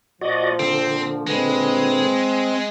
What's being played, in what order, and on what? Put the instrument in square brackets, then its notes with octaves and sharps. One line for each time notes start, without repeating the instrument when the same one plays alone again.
[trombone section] A#2 F3 [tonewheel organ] F#4 D5 D#5
[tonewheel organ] D3 [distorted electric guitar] C4
[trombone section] A#2 B4 [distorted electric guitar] G#3 [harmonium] C4